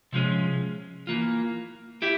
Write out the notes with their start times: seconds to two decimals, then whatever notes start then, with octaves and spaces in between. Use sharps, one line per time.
0.13 C3 F3 G#3 C#4
1.07 E3 A#3 F4
2.02 E4 G4